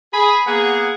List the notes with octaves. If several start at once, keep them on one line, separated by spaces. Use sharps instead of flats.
G#4 B5
A#3 B3 G#4 F#5